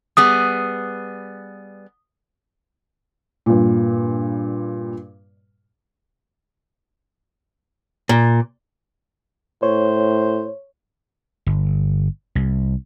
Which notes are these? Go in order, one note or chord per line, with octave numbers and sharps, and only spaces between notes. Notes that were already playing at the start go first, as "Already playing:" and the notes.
G3 B3 G#4 D#6
G2 A#2
A#2
A2 C5 C#5
G1
C2